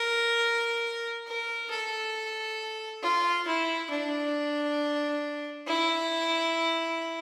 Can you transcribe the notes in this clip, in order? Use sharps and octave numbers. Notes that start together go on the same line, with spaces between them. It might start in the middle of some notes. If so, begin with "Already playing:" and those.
Already playing: A#4
A#4
A4
F4
E4
D4
E4